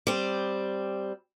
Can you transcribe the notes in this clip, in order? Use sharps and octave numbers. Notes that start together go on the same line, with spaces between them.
G3 C4